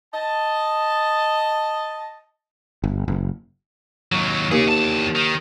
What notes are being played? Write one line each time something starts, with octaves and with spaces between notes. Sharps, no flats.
D#5 A5
G1
F#1
D#2 F#3
D#2 C#4 G#4
E2 A5
D#3